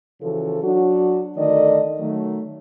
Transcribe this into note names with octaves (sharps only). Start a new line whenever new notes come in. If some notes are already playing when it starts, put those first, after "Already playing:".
C#3 E3 F3 F#4 A4
F#3 D4 F#4
D3 D#3 A3 A4 D5 D#5
D#3 F#3 A3